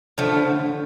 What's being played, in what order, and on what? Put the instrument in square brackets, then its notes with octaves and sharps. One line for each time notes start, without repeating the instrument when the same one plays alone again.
[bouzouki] A2 F3 A3 [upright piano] D3
[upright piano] D3
D3
D3